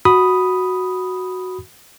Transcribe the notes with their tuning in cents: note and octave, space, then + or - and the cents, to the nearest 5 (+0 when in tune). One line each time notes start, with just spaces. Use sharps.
F#4 +0 B5 +0 D#6 +0